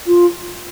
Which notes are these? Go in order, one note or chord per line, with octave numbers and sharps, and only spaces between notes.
F4